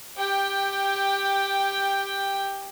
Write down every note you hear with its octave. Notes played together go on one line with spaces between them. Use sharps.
G4 G5